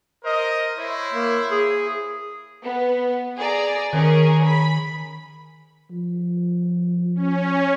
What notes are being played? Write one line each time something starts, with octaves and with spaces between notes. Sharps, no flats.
A#4 C5 D#5
E4 C5 C#5
A#3
G#4
B3
G#4 D5 A#5
D#3 C#4 G#4 A#4
B5
F3
C#4